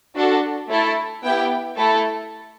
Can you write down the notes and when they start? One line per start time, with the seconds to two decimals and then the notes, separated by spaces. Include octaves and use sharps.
0.15 D4 F#4 A4
0.69 A3 E4 A4
1.23 B3 E4 G4 G5
1.77 A3 E4 A4